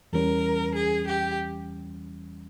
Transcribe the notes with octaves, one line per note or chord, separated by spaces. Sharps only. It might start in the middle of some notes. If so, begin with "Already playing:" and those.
E2 E3 G3 C#4 A#4
G#4
G4